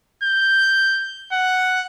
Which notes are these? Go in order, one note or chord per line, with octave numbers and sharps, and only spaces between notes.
G6
F#5